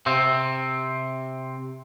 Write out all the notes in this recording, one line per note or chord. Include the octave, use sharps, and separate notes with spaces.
C3 C4